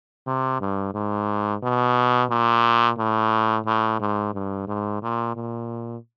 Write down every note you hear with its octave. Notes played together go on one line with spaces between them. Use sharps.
C3
G2
G#2
B2
A#2
A2
A2
G#2
G2
G#2
A#2
A#2